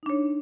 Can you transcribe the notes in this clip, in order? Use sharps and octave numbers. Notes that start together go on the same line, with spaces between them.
D4 D#4 C#5